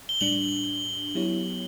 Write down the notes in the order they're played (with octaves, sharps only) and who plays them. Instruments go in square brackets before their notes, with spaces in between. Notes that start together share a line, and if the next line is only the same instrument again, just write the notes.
[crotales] G7
[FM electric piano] A2 G3 D4 [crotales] F#7
[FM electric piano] F#3 B3 E4 G4 C#5